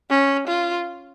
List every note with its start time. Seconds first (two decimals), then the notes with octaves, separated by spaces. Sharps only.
0.10 C#4
0.48 F4